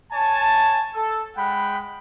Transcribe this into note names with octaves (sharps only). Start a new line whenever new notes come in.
C#5 G#5 A5
A4
G#3 F#5 G5 B5